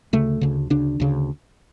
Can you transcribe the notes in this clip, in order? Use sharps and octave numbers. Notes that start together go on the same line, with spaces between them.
D2 C#3 A3
D2 C#3
D2 C#3 D4
D2 C#3